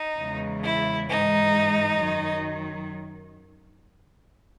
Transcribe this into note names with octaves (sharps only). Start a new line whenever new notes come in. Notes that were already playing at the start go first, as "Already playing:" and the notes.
Already playing: D#4
E2 C#3 E3 G#3
E4
G#2 E3 G#3 D#4
F#2 D#3 F#3